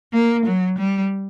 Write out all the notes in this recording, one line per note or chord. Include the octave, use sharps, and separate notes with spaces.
A#3
F#3
G3